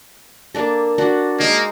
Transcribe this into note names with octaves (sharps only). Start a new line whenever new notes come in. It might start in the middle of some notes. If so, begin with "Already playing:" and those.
A#3 D4 A4
D4 F#4 F#5
G#3 A#3 D#4